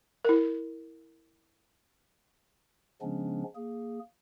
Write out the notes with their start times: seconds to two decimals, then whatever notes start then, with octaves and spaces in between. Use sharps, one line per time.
0.25 E4 A#4
3.02 C#3 F3 G#3 B3 C#4 D4
3.55 A#3 G#4